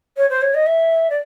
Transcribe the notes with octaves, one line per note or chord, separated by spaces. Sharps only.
C#5
C5
C#5
D#5
E5
D5